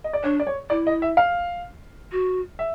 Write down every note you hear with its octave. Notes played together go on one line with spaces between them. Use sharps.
D#5
D5
D4 C#5
D5
C#5
E4 D5
D#5
E5
F5
F#4
E5